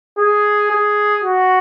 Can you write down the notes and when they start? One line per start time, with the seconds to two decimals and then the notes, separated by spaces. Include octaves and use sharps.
0.18 G#4
0.70 G#4
1.24 F#4